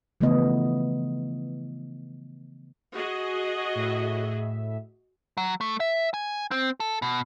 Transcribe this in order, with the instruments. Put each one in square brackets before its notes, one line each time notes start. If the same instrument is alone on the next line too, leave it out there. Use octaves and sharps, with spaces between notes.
[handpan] C#3 E3 F3 A3 B3 D#5
[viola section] F#4 G#4 D#5
[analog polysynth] A2 E5
[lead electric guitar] F#3
A3
E5
G#5
C4
A4
B2